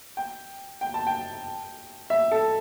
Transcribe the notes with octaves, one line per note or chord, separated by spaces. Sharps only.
G5
G5
A5
G5
E5
A4